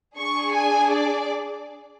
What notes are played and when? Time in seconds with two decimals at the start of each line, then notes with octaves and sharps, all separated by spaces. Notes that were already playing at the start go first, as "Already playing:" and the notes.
0.17 D4 G#4 C#6
0.56 G#5
0.93 D5